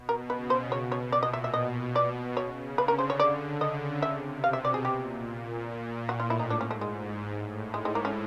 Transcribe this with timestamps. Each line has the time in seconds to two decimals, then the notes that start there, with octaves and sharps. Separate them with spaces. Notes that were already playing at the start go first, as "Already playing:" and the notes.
Already playing: B2
0.09 A#4
0.30 C#3 B4
0.50 C5
0.71 B2 C#5
0.92 C#5
1.12 A#2 D5
1.23 D#5
1.33 E5
1.44 E5
1.54 B2 D#5
1.96 D5
2.37 C#3 C#5
2.78 D3 B4
2.88 A#4
2.99 C5
3.10 C#5
3.20 D5
3.61 C#3 D#5
4.02 C3 E5
4.43 B2 F5
4.53 E5
4.65 D5
4.74 G#4
4.85 A#2 G4
5.27 A#2
6.09 A2 F#4
6.20 F4
6.30 E4
6.40 D#4
6.50 G#2 D4
6.61 C#4
6.71 A3
6.81 G#3
7.34 A2
7.74 G#2 G#3
7.85 G#3
7.95 A#3
8.05 C#4